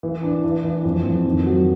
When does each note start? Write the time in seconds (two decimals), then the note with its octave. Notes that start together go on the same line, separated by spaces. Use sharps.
0.03 E3
0.23 D4
0.44 E3
0.64 E3
0.84 F2
1.05 F2
1.26 D#3
1.46 F#3